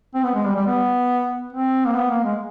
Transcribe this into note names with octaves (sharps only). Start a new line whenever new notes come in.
C4
B3
G#3
G3
G3
B3
C4
A#3
B3
A#3
G#3